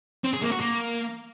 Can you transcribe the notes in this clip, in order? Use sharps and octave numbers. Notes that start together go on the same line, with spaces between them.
C4
G#4
A#3
F#4
A#3